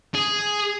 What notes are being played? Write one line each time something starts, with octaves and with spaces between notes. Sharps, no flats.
G#4